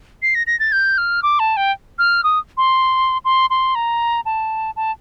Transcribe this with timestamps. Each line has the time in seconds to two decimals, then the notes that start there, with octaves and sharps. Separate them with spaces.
0.22 C7
0.35 A#6
0.47 A#6
0.60 A6
0.72 G6
0.98 F6
1.23 D6
1.39 A5
1.57 G5
1.99 F6
2.24 D#6
2.57 C6
3.25 C6
3.50 C6
3.75 A#5
4.25 A5
4.76 A5